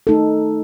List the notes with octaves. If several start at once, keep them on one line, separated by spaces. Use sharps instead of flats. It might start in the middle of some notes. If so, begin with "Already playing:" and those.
A3 D#4 A4